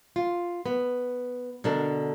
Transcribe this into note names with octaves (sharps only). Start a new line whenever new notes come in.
F4
B3
B2 D3 D4 A4 A#4